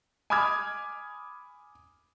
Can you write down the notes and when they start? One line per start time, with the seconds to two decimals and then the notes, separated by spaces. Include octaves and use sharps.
0.30 G#5 B5 D6 D#6 F6 G#6